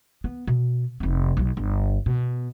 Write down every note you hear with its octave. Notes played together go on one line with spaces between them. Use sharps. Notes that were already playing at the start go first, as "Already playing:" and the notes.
B3
B2
F1 C4
B1 F#3
G1
B2